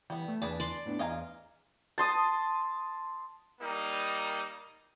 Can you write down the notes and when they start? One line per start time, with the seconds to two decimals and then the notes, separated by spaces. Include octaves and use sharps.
0.10 E3 G3 B3
0.28 A3
0.42 E2 D4 G#4 B4 A5
0.60 D5 C6
0.86 A2 B3 D4
0.99 E2 B4 D#5 F5 G#5 A#5
1.98 A5 C6 D#6
3.61 G3 A#3 D#4